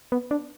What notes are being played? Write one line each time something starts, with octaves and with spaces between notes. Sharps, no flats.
B3
D4